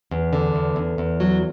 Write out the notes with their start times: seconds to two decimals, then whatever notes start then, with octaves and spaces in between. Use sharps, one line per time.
0.11 E2
0.33 D3
0.55 E2
0.76 E2
0.98 E2
1.20 F#3